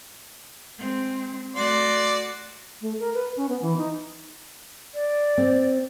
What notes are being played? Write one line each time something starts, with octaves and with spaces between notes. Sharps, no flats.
G#3 C4
A3 F#4 D5 C6
A3
A#4
B4
C#4
B3
E3
D#4
D5
C4